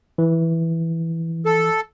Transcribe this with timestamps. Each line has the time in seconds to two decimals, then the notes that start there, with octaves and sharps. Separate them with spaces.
0.18 E3
1.46 A4